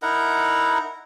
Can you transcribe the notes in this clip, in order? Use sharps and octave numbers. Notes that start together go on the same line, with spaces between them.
D#4 E4 A#4 F#5